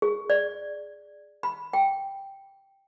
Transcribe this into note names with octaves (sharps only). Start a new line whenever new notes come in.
G#4
D5
B5
G5